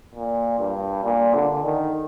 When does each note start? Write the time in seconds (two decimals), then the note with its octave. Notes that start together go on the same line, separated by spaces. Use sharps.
0.15 A#2
0.60 G2
1.04 A#2
1.34 D3
1.65 D#3